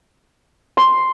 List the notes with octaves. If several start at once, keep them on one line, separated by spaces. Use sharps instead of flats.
C6